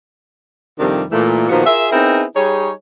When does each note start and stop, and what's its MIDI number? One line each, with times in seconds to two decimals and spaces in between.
0.79 1.03 41
0.79 1.03 48
0.79 1.03 51
0.79 1.03 53
0.79 1.03 55
0.79 1.03 62
1.11 1.46 46
1.11 1.46 52
1.11 1.46 57
1.49 1.63 46
1.49 1.63 51
1.49 1.63 53
1.49 1.63 59
1.49 1.63 66
1.65 1.87 65
1.65 1.87 68
1.65 1.87 70
1.65 1.87 76
1.92 2.23 59
1.92 2.23 60
1.92 2.23 63
1.92 2.23 64
1.92 2.23 68
1.92 2.23 70
2.35 2.69 55
2.35 2.69 63
2.35 2.69 68
2.35 2.69 73